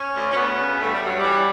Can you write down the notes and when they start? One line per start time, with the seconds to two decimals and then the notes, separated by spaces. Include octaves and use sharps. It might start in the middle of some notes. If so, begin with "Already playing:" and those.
Already playing: C#4
0.14 D2
0.31 C#4
0.36 D2 B3
0.58 C#3
0.79 G2 A3
0.92 G3
1.01 G2 F#3
1.18 E3 G3